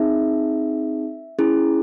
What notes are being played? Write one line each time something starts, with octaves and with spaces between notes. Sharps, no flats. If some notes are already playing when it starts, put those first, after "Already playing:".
Already playing: C4 D#4 G#4 E5
C#4 E4 G#4